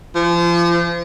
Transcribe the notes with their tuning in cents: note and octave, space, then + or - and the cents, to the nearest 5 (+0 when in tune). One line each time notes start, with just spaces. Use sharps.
F3 -30